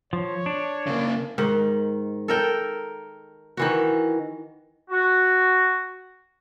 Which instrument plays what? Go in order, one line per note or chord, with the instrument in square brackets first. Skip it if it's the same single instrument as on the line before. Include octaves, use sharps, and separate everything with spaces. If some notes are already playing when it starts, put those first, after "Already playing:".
[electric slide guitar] F3 [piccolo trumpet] C#5
[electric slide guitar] D4
[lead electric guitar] C#3 A#3
[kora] G#2 D#3
A4 A#4 G5
D#3 E3 F#4
[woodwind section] F#4